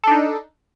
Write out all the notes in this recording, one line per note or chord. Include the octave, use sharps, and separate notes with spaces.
D4 D#4 A4